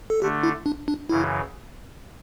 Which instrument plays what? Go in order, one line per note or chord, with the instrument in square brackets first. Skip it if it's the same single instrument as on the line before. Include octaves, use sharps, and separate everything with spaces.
[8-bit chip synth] A4
[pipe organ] D3 A3 D4 [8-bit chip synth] G4
[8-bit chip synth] E4
D4
D4
[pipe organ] F#2 C#3 E3 [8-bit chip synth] E4